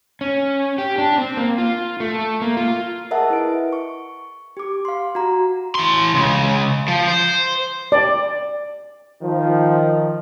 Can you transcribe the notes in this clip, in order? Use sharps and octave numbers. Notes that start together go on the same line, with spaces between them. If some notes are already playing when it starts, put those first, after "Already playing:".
C#4
G4
D4
C4
A#3
F4
A3
A#3
F4
G#4 A#4 D#5 E5 F#5 A5
E4 B4 D7
C#6
G4 D6
F5 C6
F#4 A#5
E3 C6
C#3 G#3
F3
C5
D5
D#3 F3